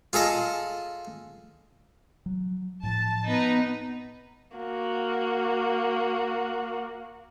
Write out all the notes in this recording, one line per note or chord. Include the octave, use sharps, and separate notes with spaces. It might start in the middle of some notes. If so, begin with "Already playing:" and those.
F4 G#4 A4 D#5
F#3
A2 F3 A5
B3 D#4 B4 A#5
A#3 F#4